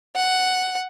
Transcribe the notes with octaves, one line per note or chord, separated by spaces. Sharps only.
F#5